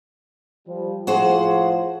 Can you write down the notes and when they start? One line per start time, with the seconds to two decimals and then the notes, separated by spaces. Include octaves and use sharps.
0.67 F3 G3
1.07 A2 F3 F#4 G#4 C5